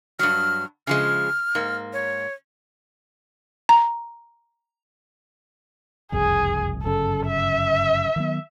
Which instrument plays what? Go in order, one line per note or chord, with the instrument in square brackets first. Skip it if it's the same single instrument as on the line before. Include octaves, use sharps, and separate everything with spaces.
[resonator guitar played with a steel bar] G2 F#3 [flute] F6
[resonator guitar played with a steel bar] C#3 F3 G#3 [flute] F6
[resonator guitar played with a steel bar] G#2 A#3
[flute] C#5
[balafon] A#5
[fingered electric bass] F#1 C2 F2 [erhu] G#4
[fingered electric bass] G1 F#2 C#3 [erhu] A4
[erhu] E5
[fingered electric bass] D#3 F#3 B3